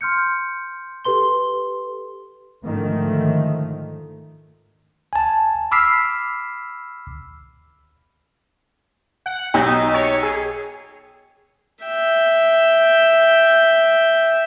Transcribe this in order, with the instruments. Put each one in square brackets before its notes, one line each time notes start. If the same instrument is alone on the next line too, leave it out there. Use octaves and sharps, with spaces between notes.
[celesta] C6 F6 G6 C#7
G4 A4 B4 C6 G7
[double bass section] G#2 D3 D#3 F3 A3
[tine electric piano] G#5 A5
B5 D6 E6 F6 B6 C7
[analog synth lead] F#5
[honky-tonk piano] B1 G4 [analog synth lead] D#4
[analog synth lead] C#5
G#4
[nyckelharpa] E5 G5